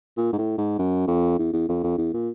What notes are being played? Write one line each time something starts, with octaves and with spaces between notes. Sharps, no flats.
A#2
G#2
A2
G#2
F#2
F2
E2
E2
F2
F2
E2
A#2